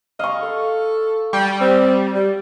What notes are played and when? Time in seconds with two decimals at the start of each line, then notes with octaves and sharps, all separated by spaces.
0.19 D#5 F5 C#6
0.43 A4
1.33 G3 G5
1.61 C4
2.14 G3